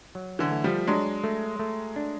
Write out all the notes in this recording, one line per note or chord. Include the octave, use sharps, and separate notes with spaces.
F#3
D3 E3
A3
F3 G3
F#3 G#3 D4
A3
A3
D4